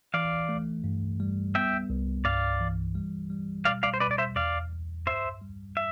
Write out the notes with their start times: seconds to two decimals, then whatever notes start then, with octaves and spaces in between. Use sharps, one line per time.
0.14 E3 D5 F5
0.49 A3
0.84 G2
1.20 G3
1.55 B3 E5 G5
1.90 C2
2.24 G2 D5 F5
2.60 E3
2.95 G3
3.30 G3
3.65 B2 D5 F5
3.83 D5 F5
3.94 C5
4.00 B2 B4 D5
4.11 D5
4.18 C5 E5
4.36 E2 D5 F5
4.72 E2
5.06 G2 C5 E5
5.42 G3
5.77 E5